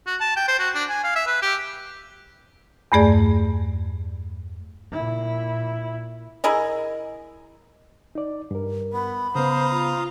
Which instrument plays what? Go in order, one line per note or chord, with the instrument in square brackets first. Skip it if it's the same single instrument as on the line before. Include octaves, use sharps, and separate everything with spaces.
[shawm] F#4
A5
G5
C5
F#4
D4
G#5
F5
E5
B4
G4
[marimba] E2 G2 A3 G#4 D5
[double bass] A#2 E4
[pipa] E4 G#4 A#4 D#5
[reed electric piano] D#4 D5
G2 A#4
[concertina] B3 [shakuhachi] B5
[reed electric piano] C#3 B3 [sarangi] C5 [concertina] F5 A#5 D#6
[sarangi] F4